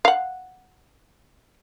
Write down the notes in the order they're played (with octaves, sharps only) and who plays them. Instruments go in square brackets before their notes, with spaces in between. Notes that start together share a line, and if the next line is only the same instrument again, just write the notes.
[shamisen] F5 F#5